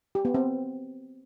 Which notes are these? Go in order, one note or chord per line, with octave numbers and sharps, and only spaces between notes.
G4
B3
C4